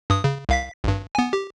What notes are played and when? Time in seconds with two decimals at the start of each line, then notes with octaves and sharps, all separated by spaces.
0.10 G2 D#6
0.24 C#3
0.49 C2 F5 B6
0.84 G#1 G2
1.15 B3 G#5
1.33 G4